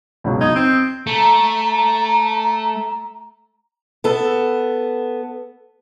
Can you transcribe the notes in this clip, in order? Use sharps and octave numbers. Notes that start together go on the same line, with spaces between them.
C#2 B2 F#3
D#4 D#6 G#6
C4
A3 A#5
B3 A4